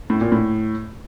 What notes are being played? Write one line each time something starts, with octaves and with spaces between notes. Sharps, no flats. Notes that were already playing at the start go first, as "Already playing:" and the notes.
A2
A#2
A2